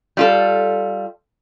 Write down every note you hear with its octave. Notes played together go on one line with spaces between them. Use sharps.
G3 F4 A4